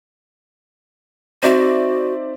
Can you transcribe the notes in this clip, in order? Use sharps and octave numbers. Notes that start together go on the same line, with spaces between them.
C4 D#4 F#4 C5 D5 E5